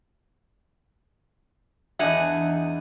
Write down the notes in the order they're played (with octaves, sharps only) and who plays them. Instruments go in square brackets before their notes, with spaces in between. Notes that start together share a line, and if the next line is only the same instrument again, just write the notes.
[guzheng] E2 D4 D#4 [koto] G#4 F#5 G#5 [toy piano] D#5 E5